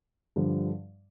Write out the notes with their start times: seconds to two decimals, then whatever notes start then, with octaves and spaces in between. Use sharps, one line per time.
0.36 G2 D3 F3